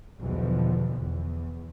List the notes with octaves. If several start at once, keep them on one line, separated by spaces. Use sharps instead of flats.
B1 E2 B2 D3 F3
E2